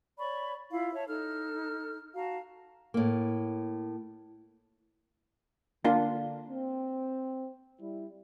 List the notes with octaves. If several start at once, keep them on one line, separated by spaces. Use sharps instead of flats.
C#5 D5 B5 C#6
E4 F4 F5
C#5 E5 A5
D#4 A4 F6
F#4 F5 A5 A#5
A2 A#3
D3 A#3 D4 F4
C4
G3 E4